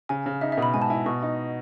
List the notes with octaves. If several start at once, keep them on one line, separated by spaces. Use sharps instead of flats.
C#3 G#5
C#3
D#4 E5
E5
B2
B5
G#2 G#5
A5
E4 G#5
B2 C#6
D#4